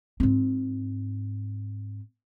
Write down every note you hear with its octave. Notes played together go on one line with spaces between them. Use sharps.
G#2 C4